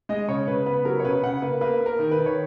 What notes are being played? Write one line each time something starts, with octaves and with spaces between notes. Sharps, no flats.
G#3 D#5
C#3 C#5
C#3 B4
B3 B4
F#3 A#4
C#5
C#3 B4
C#3 F#5
A#3 B4
A#3 B4
A#3
A#4
D#3
B4
D#3
C#5